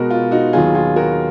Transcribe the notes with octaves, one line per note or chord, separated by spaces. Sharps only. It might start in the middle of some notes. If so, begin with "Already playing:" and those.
Already playing: B2 G#3 B3 F#4 A#4
F4
D#4 F#4
D#2 D#3 F#3 B3 F4 G#4
F4 G#4
F#4 A#4